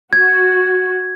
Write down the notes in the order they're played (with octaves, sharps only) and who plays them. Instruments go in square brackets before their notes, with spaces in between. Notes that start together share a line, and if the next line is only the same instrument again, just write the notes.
[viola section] F#4 [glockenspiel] G#6